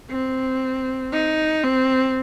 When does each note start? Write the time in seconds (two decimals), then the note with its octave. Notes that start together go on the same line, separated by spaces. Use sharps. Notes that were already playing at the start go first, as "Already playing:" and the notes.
0.10 C4
1.13 D#4
1.63 C4